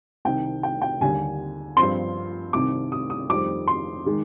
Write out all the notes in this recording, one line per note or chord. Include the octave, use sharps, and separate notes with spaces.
C2 C3 D#3 G5
G5
G5
D#2 D3 G3 G#5
G2 F3 C4 C6
C2 C3 D#3 D6
D#6
D#6
F2 D#3 G3 C4 D6
C6
D#3 G#3